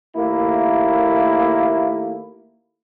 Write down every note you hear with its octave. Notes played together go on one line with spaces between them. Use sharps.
D#2 A3 A#3 E4